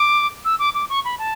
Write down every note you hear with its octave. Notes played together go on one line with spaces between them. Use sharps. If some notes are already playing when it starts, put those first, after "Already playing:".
Already playing: D6
E6
D6
D6
C#6
B5
A5